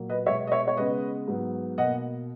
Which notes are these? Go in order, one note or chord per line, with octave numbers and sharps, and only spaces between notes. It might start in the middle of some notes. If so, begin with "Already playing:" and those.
Already playing: A#2 F#3 A#3
B4 D#5
B2 G#3 B3 C#5 E5
D#5
C#5 E5
C#5
C#3 G#3 B3 B4 D#5
G#2 F#3 B3
B2 A#3 D#5 F#5